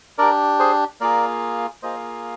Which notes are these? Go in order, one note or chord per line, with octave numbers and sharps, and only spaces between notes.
D4 G4 A#4 D5
G#4 C5
A#3 F4 G#4 A#4 D5
A#3 F4 G#4 C5 D#5